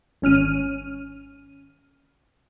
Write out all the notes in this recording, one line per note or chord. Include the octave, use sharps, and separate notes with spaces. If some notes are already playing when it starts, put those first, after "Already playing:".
G#1 C#4 F6 D#7